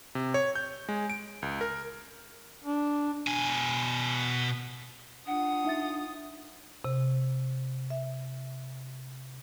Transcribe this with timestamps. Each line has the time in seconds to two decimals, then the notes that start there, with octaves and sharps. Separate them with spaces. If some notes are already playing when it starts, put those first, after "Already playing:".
0.15 C3
0.34 C#5
0.55 G6
0.89 G#3
1.10 D7
1.42 C#2
1.61 A#4
2.64 D4
3.27 B2 G#5
5.27 D4 F4 F#5 D#6
5.65 D#4 E5 A6
6.84 C3
7.90 E5